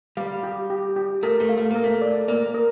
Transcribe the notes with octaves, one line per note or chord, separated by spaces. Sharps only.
G3 F5
G4
G4
G4
A3 A#4
A3
F5
A3
A#3 A#4
A3
D5
A#3 D5
A#4